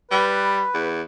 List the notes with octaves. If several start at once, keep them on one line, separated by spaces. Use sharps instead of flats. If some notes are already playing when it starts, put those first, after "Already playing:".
G3 B4
E2